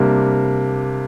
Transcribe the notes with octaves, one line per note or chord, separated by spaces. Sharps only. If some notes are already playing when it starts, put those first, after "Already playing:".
Already playing: C3 G3 A#3 D4